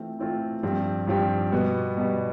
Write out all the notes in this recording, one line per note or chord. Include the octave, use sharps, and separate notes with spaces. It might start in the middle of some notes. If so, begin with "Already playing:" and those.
Already playing: E3 A3 C4 F4
E3 A3 C4 F4
G2 F3 C4 G4
G2 F3 C4 G4
B2 G3 B3
B2 G3 B3